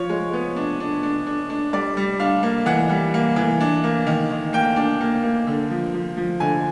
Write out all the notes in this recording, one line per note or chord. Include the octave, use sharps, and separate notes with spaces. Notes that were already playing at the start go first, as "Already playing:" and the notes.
Already playing: F3 C#5
G#3
B3
D4
D4
D4
D4
D4
G3 D5
G3
D4 F5
A#3
E3 F#5
G3
A#3
E3
D4
A#3
D#3
D#3
A#3 G5
D4
A#3
A#3
D3
F3
F3
F3
D3 G#5